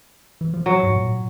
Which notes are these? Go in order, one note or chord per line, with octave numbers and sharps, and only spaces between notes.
E3
F3
F#3
G#2
A#2